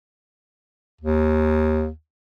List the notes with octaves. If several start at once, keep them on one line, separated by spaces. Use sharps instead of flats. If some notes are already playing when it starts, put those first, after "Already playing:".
D#2